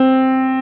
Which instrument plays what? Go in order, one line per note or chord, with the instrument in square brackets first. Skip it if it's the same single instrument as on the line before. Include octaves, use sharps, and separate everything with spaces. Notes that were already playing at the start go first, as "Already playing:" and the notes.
Already playing: [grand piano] C4